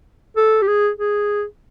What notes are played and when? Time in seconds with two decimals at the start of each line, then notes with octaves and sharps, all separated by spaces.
0.37 A4
0.62 G4
0.67 G#4
0.99 G#4